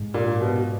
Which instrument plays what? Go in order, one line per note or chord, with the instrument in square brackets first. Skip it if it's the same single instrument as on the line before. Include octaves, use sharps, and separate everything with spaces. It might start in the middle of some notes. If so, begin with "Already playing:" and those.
Already playing: [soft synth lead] G#2
[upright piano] A#2
B2